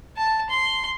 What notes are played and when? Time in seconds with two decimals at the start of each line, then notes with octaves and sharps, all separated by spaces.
0.17 A5
0.50 C6